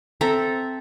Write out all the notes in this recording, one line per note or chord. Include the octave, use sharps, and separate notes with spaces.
C4 A4 E5 A#5